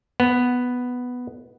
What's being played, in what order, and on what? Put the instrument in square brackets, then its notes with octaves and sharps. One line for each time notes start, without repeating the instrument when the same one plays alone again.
[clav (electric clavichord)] B3